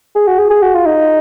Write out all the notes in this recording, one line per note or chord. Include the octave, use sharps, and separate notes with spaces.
G#4
F#4
G#4
G#4
F#4
F4
D#4